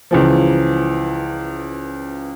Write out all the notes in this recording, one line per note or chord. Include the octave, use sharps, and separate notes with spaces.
C#2 E3 F3